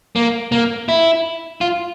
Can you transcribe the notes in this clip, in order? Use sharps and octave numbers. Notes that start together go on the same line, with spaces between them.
A#3
A#3
E4
F4